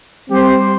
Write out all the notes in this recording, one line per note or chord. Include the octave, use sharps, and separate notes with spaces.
G3 C4 G4 C5